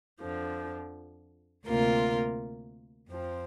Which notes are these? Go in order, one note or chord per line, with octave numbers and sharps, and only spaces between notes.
F2 D3 F3
D2 C3 A#3 F4 A#4
F2 F3 C4